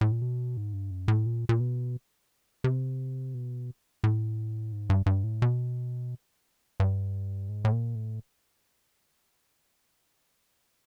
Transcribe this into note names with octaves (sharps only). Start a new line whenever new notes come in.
A2
A#2
B2
G#2
G2
F#2
A2
A#2
A#2
B2
C3
B2
A2
G#2
G2
G2
A2
B2
G2
G#2
A2
A#2
A2